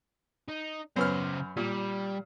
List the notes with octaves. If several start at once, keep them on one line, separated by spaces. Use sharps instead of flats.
D#4
F#2 C#3 B3 C5 F6
A#2 G3